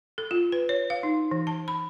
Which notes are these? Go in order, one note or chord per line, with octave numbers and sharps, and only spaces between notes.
A4
F4
B4
C#5
F5
D#4
E3
A5
B5